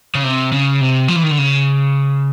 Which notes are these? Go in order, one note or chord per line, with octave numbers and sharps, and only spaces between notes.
C#3
C3
C#3
C3
F3
E3
D#3
D3
C#3